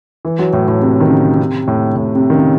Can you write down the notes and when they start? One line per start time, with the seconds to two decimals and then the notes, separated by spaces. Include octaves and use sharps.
0.25 E3
0.39 F#3
0.53 A2
0.68 A2
0.82 C3
1.00 D#3
1.10 C#3
1.39 C3
1.68 A2
1.96 A2
2.15 C3
2.30 D#3
2.34 C#3